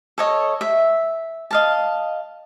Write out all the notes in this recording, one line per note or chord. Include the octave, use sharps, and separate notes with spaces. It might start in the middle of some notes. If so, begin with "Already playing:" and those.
A4 C#5 D#5
E5
D#5 F5 A5